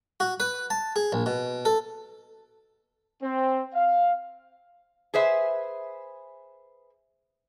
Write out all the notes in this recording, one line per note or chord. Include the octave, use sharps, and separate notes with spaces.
F#4
B4
A5
G#4
A#1
B2
A4
C4
F5
G#4 B4 C5 E5